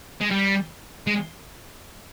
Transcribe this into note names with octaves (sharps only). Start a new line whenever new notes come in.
G#3
G3
G#3